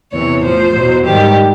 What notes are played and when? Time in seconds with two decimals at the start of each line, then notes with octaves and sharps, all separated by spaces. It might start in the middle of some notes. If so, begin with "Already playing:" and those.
0.12 E2 C3 E3 C#5
0.43 A2 F3 C5
0.74 E2 B2 F#3
1.05 G#2 D#3 G3 G4